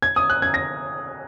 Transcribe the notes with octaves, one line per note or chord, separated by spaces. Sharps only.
G#6
D#6
F#6
G#6
A#6